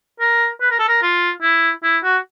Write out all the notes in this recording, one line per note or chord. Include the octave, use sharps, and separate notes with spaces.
A#4
B4
A#4
A4
A#4
F4
E4
E4
F#4